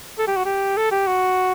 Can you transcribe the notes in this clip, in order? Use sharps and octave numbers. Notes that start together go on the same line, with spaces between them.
A4
G4
F#4
G4
A4
G4
F#4